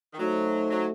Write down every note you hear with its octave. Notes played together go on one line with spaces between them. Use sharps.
D#3
F#3 A3 D#4 F#4 C5
F#3